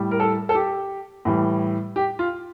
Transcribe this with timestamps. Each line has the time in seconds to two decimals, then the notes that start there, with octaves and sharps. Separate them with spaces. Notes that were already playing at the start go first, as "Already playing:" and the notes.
Already playing: A2 G3
0.11 A#4
0.20 A4
0.49 A4
0.55 G4
1.25 A2 E3 G3
1.96 G4
2.19 F4